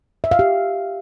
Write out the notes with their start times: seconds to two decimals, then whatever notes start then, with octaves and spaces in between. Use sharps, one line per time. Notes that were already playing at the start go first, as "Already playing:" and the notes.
0.24 E5
0.31 F5
0.39 G4